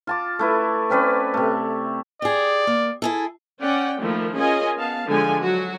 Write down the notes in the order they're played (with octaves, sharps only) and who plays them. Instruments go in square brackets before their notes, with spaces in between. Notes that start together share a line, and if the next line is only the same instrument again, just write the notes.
[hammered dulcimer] F4 A5 D6
A3 E4 B4
C4 C#4 B4 D5
C3 A3
[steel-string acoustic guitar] G4 G#4 [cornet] D5
[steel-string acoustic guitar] A#3
E4 G#4 A4
[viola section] C#4 D5 F#5 G5
D#3 F3 A3 A#3 E4
C#4 F4 G#4 A#4 D#5 G#5
B3 F5 A5
D3 F3 G#3 G#5
F#3 F#4